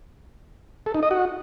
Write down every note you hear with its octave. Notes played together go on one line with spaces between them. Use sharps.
A4
D#4
D#5
F#4